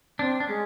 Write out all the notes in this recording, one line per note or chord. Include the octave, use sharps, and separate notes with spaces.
C4 D4
D4
G#3 C#4